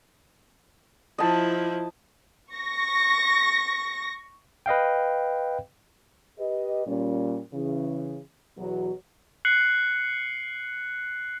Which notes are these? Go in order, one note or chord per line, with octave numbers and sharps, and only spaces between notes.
F3 E4 D#5 A5
C#6 A#6
B4 D#5 F5 G5
G4 B4 D#5
A#2 G3 C#4
C#3 E3
E2 B2 E3 F#3
F#6 C7 C#7 F#7